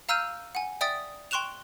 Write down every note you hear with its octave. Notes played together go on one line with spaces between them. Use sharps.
F5 A#5 E6 F6 G6 D#7
F#5 G#5
D5 E5 G5 D#6 A6
G5 C6 C#6 F#6 E7 F7